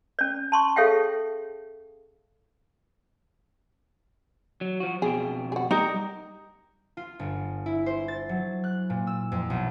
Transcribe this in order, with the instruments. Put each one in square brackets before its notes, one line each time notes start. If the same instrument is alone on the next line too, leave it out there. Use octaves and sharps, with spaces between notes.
[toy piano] C#4 D5
A5 C6 C#6
G#4 A4 C#5 E5 F5 G5
[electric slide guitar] F#3
F3 F#4
[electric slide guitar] F2 B2 G5 [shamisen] G#4
[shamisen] F#4 G#4
[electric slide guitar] G3 [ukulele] D#4 A#4 [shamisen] G4
[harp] F4
G1
E4
C5
A6
F#3
F#6
A#2
E6
F2
B1